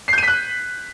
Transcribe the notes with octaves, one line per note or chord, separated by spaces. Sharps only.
F#6 G6 B6 C7 D#7